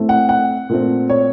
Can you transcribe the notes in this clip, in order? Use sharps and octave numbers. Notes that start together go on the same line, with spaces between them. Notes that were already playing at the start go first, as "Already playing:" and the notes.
Already playing: A2 A3 C4
F#5
F#5
A#2 A3 C4
C#5